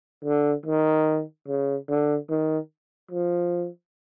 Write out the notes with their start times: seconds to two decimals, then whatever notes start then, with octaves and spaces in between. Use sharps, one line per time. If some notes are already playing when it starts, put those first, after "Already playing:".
0.25 D3
0.66 D#3
1.48 C#3
1.89 D3
2.30 D#3
3.11 F3